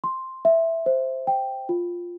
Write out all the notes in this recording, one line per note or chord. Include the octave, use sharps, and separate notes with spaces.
C6
E5
C5
G5
F4